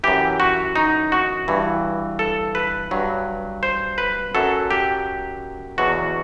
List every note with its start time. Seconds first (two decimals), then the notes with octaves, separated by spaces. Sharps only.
0.04 F#2 E3 G4
0.40 F#4
0.76 D#4
1.12 F#4
1.48 G2 E3
2.19 A4
2.55 B4
2.91 G2 F#3
3.63 C5
3.98 B4
4.35 F#2 F#3 A4
4.71 G4
5.78 E2 B2 F#3 F#4